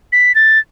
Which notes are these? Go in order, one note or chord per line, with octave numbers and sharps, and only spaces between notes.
B6
A6